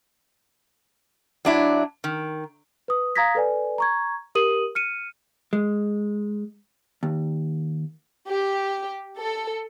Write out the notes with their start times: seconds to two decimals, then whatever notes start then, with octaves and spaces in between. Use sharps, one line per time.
1.45 F#3 D4 E4
2.04 D#3
2.88 B4 D#6
3.16 F5 A#5 D#6 G#6 A#6 B6
3.35 A4 B4 D5 G#5
3.78 A#5 C#6 G#6
4.35 G4 A#4 D#6 D#7 F#7
4.75 F6 C#7 D#7
5.53 G#3
7.03 D#2
8.27 G4
9.19 A4